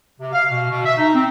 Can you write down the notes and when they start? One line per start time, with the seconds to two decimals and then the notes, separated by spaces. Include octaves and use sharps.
0.20 C3
0.33 F5
0.51 B2
0.69 B2
0.85 E5
0.98 D#4
1.14 C4